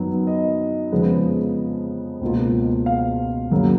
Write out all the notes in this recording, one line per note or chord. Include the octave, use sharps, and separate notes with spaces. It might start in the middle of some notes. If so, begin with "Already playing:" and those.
Already playing: F#2 D#3 F#3 B3
D#5
F2 C#3 F3 G#3 B3
C#2 B2 A#3 F4
F5
F#2 C#3 F#3 A#3 C#4